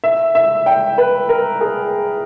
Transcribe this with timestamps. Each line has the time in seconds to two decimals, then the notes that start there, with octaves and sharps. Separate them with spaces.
0.04 E5
0.35 E5
0.66 G5
0.98 B4
1.29 A#4
1.61 G#4